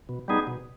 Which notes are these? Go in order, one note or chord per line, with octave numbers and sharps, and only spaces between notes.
B2
G3 B3 D#4 G#4
B2